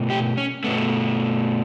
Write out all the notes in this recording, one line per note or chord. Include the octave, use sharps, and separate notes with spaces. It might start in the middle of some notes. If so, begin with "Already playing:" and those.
Already playing: B2 A3
G4
C#4
B2 A3 B3